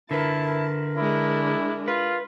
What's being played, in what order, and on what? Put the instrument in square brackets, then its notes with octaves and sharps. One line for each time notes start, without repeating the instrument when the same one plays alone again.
[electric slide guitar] D3 B4 [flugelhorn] E4 [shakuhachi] A#4 [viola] A5
[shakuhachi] A#4
[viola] G#3 D4 [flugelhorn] E4
[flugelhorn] F4 [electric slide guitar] B4